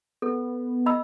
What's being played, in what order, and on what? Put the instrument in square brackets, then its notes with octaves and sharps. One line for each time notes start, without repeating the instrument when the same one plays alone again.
[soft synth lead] B3 [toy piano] A4
[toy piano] D#5 B5 E6